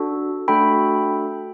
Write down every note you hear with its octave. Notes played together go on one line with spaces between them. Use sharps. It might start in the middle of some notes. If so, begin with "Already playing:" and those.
Already playing: D4 F#4 A4
A3 D4 F#4 A4 G5 B5